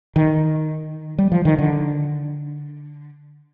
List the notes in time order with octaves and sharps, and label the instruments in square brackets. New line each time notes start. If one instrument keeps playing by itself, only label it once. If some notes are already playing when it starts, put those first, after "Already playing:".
[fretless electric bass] D#3
G3
F3
D#3
D3